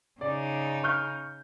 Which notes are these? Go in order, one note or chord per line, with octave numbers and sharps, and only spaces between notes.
C#3 D#4 D5
C#6 F6 G6